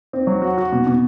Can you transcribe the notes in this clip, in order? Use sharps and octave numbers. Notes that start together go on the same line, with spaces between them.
C4
F#3
F#4
F#4
B2
B2